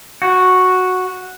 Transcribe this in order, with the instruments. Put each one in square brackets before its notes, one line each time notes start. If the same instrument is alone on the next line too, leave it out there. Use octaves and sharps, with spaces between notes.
[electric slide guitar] F#4